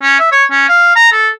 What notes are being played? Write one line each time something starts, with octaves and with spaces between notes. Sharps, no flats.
C#4
E5
C#5
C#4
F5
A#5
A4